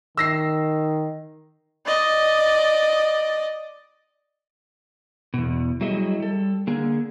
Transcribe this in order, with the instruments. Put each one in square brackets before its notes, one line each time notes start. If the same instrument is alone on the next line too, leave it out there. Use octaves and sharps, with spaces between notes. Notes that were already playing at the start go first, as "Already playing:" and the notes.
[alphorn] D#3 [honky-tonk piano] E6 A#6 C7
[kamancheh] D5 D#5
[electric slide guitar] E2 B2
F#3 G3 A3 E4 G#4 D#5
G3 A4
D3 A#3 G#4